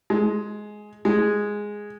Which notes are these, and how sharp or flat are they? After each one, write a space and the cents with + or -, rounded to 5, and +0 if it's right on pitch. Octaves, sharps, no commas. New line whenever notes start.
G#3 +10
G#3 -5